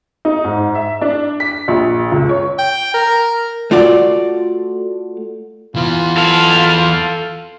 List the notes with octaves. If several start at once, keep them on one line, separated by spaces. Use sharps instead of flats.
D#4
G#2
E5
D4
B6
A#1
C#2
C#5
G5
A#4
A3 F4 F#4 D5
E3 B3 F4
A4 F5